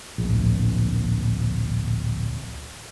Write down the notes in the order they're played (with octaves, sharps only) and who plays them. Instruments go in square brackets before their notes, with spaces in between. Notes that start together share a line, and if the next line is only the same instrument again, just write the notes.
[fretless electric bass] D1 A#1